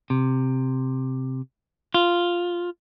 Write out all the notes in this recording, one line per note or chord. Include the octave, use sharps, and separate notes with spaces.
C3
F4